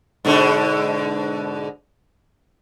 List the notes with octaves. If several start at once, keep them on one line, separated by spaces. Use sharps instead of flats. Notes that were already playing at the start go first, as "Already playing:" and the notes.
G#2 B2 D3